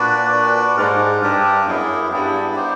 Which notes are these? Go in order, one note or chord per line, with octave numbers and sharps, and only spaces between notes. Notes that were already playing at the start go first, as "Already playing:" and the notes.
Already playing: A#2 D4 F#4 B4 D5
D4 F#4 B4 D5
G#2 D4 G4 A#4
G2 D4 G4 A#4
F#2 B3 E4 G#4
G2 B3 E4 G#4
B3 D#4 G4 C5